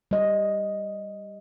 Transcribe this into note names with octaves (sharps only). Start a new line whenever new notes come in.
G3 D#5